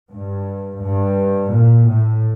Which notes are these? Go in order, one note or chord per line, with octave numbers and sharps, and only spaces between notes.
G2
G2
A#2
A2